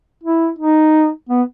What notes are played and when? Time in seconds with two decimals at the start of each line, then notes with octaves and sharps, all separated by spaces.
0.23 E4
0.59 D#4
1.29 B3